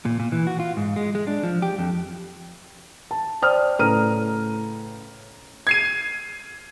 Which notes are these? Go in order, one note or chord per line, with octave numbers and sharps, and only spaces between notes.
A#2
A#2
E3
F#4
F4
G#2
G#3
G#3
D4
F3
G4
F2
A5
C5 D5 G5 D#6 F6
A2 C#3 B4 A#5 F6 D#7
G#6 C7 D#7